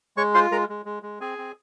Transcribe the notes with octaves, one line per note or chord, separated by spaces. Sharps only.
G#3 C#5 C#6
F4 C5 C6
G#3 A#4 A#5
G#3
G#3
G#3
C4 G#4 G#5
C4